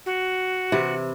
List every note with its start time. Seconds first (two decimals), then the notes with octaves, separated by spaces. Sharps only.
0.06 F#4
0.72 C3 E3 E4